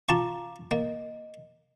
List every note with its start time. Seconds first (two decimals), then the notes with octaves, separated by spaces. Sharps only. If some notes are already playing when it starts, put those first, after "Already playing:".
0.09 F4 F5 A5 A#5 C#6 D6
0.71 A#3 D#5